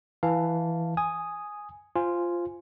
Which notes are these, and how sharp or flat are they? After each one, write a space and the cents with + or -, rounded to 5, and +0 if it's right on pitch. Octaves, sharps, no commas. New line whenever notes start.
E3 +0 F5 +0 A5 +0
G#5 +0 D#6 +0
F4 -5 C5 +0 G#5 +0